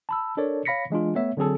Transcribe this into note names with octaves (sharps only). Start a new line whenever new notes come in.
A5 B5 E6
D4 A4 A#4 C#5 D5
C#5 F5 B5 A#6 B6 C#7
E3 G#3 D4 F4
A3 B3 C#5 E5
D3 F#3 C4 G#4 A4